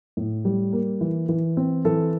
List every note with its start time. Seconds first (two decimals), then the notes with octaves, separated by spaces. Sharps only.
0.17 A2
0.45 G3
0.73 A#3
1.01 E3
1.29 E3
1.57 C4
1.85 E3 A4